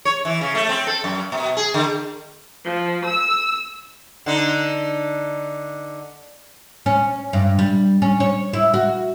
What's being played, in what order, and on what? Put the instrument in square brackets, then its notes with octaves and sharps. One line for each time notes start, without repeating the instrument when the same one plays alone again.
[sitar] C#5
E3
C#3
A3
C4
A4
F#2
B2
G#4
D3
[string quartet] F3
E6
[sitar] D3 D#4
[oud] C#4
G2
G3
C#4
C#5
E4
F#4